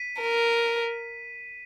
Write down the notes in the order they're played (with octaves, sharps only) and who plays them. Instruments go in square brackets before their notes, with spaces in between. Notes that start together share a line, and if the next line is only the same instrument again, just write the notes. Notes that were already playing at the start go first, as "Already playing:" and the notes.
Already playing: [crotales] B6 D#7
[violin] A#4